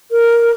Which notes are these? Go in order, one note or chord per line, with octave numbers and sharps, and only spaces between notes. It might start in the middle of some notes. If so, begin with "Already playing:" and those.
A#4